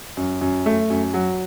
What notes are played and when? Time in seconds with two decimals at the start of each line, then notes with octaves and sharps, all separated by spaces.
0.17 F#2
0.41 F#2
0.66 A3
0.90 F#2
1.14 F#3